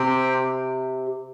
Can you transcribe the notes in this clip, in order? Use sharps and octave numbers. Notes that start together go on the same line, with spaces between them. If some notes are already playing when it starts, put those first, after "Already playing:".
Already playing: C3 C4 G4 C5 G5